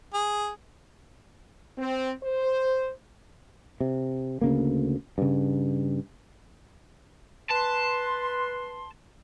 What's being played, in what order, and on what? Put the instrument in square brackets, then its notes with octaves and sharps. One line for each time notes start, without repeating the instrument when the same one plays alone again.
[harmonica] G#4
[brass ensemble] C4
C5
[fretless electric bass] C3
D2 C#3 A#3
G2 C#3
[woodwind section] B4 C6 [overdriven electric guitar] A5